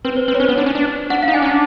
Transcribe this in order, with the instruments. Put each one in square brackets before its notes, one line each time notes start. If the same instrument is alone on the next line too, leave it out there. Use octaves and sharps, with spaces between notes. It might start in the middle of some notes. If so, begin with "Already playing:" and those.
[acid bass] C4 [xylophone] B4
[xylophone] C5
[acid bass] C4 [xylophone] B4
[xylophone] C#5
[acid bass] C#4 [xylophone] C5
[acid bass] B3
D4
C#4
D4
[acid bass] D4 [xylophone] F#5
[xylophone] F5
[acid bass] D#4
[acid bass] D4 [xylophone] G#5
[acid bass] C#4
D4